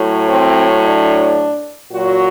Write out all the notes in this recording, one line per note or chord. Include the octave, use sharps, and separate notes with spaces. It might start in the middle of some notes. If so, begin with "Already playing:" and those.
Already playing: A2 F#3
C4
D4
A#2 F#3 F#4